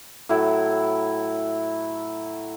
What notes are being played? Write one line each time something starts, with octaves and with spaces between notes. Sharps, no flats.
A2 F#3 E4